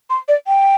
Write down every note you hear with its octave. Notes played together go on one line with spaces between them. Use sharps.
C6
D5
G5